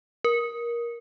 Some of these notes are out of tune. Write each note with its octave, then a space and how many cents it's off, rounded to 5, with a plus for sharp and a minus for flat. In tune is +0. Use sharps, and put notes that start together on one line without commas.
A#4 +15